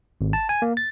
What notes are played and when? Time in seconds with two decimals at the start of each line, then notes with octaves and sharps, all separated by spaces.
0.21 G#1
0.33 A5
0.49 G#5
0.62 A#3
0.77 A6